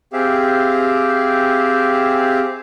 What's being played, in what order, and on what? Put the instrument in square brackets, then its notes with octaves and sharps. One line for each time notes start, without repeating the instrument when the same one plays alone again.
[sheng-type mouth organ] C4 G4 G#4 E5 F5